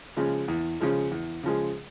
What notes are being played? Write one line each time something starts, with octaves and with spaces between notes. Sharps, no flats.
C#3 F3 G#3
E2
C#3 F3 G#3
E2
C#3 F3 G#3